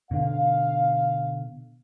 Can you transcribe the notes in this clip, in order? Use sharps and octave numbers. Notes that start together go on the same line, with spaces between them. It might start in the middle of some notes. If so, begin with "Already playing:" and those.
B2 D3 F5